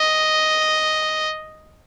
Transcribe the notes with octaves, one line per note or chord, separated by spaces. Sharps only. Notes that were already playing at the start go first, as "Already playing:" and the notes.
Already playing: D#5